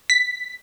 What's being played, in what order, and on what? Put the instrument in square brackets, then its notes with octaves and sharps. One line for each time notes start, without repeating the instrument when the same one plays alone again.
[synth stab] B6